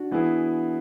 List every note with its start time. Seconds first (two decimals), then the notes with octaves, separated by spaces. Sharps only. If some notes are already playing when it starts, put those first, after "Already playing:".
Already playing: D4 F#4
0.11 E3 B3 E4 G#4